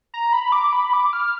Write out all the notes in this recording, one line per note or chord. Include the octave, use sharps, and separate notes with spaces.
A#5
B5
D6
B5
D6
F6